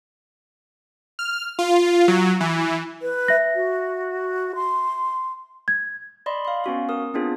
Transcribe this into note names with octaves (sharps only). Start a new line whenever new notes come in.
F6
F4
F#3
E3
B4
E5 A#6
F#4
C6
G#6
D5 D#5 B5 C6
F5 C6
B3 C#4 F#4 F5
A#4 D#6
B3 C4 D4 F4 G#4